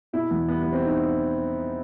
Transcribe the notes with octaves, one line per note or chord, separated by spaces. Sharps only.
B2 E4
E2 B3
G3 B3
B3
G3
C4
D#4